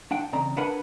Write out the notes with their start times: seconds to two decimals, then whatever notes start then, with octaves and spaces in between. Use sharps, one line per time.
0.11 D4 F#5 G5
0.33 E2 C#3 C4 D5 A#5
0.57 D4 A#4 B4 F#5 G#5 B5